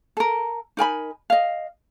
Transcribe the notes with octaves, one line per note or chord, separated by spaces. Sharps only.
A4 A#4
D#4 A#4 G#5 B5
D#5 F5